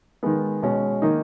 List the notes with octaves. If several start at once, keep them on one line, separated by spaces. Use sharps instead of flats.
D#3 G#3 B3
B2 G#3 C#4
D#3 A#3 D#4